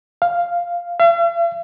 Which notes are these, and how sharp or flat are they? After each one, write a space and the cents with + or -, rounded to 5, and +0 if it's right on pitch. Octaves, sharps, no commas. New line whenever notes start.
F5 +0
F5 -45